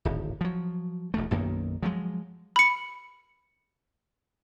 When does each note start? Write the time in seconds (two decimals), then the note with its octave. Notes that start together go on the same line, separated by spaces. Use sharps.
0.05 D1 G#1
0.41 F3 F#3
1.14 E1 D2 A3
1.31 B1 F#2 D#3 A#3
1.83 F3 F#3 G#3
2.56 B5 C#7